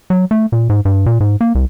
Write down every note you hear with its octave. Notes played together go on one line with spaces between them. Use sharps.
F#3
A3
A#2
G#2
G2
A#2
G#2
A#3
C2